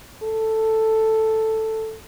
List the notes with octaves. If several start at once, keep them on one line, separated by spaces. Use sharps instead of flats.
A4